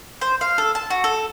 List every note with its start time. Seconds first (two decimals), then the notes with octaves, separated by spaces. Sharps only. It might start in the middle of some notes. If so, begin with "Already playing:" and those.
0.21 C5
0.41 F5
0.58 A4
0.75 A5
0.90 F#4
1.04 A4